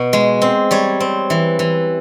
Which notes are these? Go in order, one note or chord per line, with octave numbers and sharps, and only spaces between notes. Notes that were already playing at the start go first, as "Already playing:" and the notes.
Already playing: B2
G#3
C4
G3 C#5
C4
E3
E3